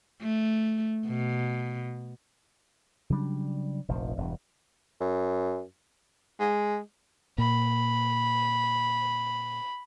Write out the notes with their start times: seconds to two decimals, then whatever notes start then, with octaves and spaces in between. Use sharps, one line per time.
0.22 A3
1.07 B2
3.10 C#3 F#3 G3 D4
3.88 F1 A#1 F3
4.17 E1 G2
5.01 F#2
6.40 G#3
7.38 A#2 B5